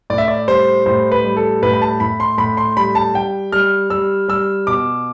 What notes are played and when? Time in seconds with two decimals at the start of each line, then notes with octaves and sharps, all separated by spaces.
0.10 A2 D5
0.18 E5
0.28 D5
0.48 G3 C5
0.86 A2 C5
1.12 B4
1.24 G3
1.37 A4
1.62 A2 B4
1.74 B5
1.82 A5
2.00 A2 B5
2.20 C6
2.38 A2 B5
2.57 C6
2.77 G3 B5
2.95 A5
3.14 G3 G5
3.52 G3 F6
3.90 G3 E6
4.28 G3 E6
4.67 B2 D6